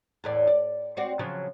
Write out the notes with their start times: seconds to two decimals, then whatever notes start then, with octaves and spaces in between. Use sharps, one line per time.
0.24 E2 A2 D5
0.47 D5
0.97 C4 F#4 D5
1.19 C#3 F3 F#3